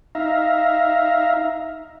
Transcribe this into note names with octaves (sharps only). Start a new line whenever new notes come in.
D#4 E5 F5 A#5